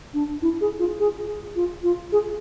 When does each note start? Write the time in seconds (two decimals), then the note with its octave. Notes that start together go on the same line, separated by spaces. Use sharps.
0.14 D4
0.42 E4
0.61 G#4
0.79 F4
0.99 G#4
1.56 F4
1.83 F4
2.12 G#4